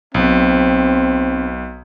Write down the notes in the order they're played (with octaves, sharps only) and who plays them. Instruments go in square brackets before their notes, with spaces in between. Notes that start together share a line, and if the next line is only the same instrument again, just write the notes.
[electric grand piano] B1 [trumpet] C4